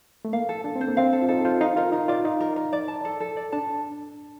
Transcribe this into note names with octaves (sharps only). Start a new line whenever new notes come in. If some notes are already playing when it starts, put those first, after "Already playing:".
A3
A#3 F5
A4
D4 A4
C4
C5
A#3
C4 F5
A4
F4
D#4 A4
F4 C5
D#4 F5
F4 A#4
D#4 A#4
F4 D5
D#4 F5
A#4
A#4
D5
A5
A4
A4
D5
D4 A5